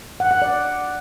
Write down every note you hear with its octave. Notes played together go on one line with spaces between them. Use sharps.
F#5
F#5
D5